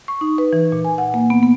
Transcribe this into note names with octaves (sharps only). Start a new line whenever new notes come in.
C#6
D#4
B4
E3
A#2
G#5
F#5
A#3
B3
B3